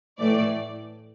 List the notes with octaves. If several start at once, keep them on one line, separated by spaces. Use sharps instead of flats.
A2 E3 A3 D5